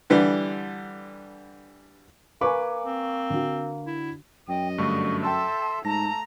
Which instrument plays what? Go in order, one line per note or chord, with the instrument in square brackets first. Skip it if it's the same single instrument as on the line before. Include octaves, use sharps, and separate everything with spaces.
[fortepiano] D3 E3 G3
[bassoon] A#3 [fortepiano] B4 [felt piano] G#5 C#6 D6
[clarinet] C4
[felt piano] D3 F#4
[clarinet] E4
[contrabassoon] F#2 [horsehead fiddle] D#5 [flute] G5
[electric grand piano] G2 D3 A3 [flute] C#6
[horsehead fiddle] A4 E5 [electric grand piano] G5 A5 E6 [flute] C6
[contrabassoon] G#2 [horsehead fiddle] A3 A#5 [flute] A5 [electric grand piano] A#6